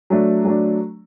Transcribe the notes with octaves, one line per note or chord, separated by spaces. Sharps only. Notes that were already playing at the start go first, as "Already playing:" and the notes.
F#3 A3 D4
F#3 A3 D4